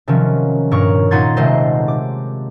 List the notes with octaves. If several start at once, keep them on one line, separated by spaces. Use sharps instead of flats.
C3 D#3 F3 F#3 C#4
G2 A#2 A#4 C#5 C#6
A#2 D#4 F#5 C6 G#6 A6
D#1 C3 G#3 A3 C5 D#5
D6